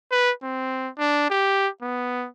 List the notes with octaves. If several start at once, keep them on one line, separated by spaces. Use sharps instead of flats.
B4
C4
D4
G4
B3